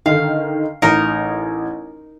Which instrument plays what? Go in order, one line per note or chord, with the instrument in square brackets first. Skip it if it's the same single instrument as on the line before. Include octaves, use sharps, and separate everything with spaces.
[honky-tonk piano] D3 D#3 [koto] F5
[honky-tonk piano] A1 [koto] D#4 A#4